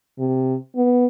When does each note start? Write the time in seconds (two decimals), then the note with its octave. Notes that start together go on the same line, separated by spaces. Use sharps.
0.18 C3
0.76 B3